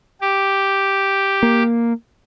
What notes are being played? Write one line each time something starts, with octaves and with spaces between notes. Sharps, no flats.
G4
A#3